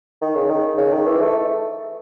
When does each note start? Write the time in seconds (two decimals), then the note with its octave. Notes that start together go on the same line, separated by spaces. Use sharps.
0.21 D#3
0.35 C#3
0.49 D#3
0.78 C#3
0.92 D#3
1.06 E3
1.21 A3